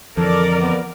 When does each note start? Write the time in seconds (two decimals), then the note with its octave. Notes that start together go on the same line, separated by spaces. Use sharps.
0.17 F2 D3 E3 F3 A4 A#4 D5
0.61 B3